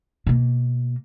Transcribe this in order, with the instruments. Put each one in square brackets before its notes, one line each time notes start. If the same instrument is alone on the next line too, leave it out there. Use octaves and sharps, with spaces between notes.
[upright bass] B2 A#3